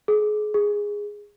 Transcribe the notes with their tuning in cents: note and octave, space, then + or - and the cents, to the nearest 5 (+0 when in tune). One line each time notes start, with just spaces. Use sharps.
G#4 +30
G#4 -10